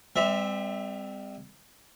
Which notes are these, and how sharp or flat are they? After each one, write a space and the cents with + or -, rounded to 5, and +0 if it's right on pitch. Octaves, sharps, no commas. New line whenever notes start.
G3 +35 C4 -25 E5 -10